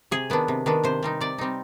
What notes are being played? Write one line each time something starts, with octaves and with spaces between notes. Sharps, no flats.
C3 G#4
D#3 B3 D4
C3
D#3 B3 D4
C3 C5
G3 C4 D#4
C3 D5
G3 C4 D#4